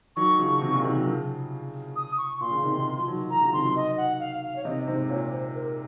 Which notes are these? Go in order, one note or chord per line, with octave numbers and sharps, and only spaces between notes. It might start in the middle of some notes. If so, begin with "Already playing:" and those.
D#3 F#3 C#6
C#3 F3
C3 D#3
A#2 C#3
C3 D#3
D#3 F#3
C#3 F3
D#6
C#6
A#2 C6
A#2 C#3
C3 D#3
C3 D#3
F3
D#3 F#3
D#3 F#3 A#5
C#3 F3
C3 D#3 C6
F3
D#3 F#3
D#5
F#5
F5
F5
C#5
C3 D#3 D#5
G#2 C3 C5
A#2 C#5
C5
A#4